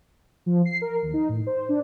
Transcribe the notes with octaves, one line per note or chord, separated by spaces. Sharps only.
F3
C7
A#4
D#2
D#4
A2
C5
D4